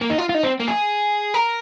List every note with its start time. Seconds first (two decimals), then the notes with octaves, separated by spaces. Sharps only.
0.01 A#3
0.10 D#4
0.18 F4
0.29 F4
0.35 D#4
0.43 C4
0.60 A#3
0.68 G#4
1.34 A#4